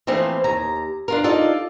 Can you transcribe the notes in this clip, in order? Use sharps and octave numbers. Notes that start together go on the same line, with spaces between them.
E3 F3 A3 A#3 C4
D#2 A#5
D4 F4 A#4
D#4 F4 A4 D5 D#5